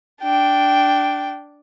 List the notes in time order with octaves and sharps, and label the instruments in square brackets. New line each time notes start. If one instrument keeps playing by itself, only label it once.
[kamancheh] D4 G5